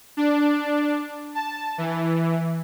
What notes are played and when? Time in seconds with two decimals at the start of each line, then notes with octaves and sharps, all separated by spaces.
0.17 D4
1.35 A5
1.78 E3